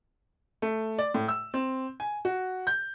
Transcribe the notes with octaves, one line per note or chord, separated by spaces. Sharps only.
A3
D5
A2
E6
C4
G#5
F#4
G6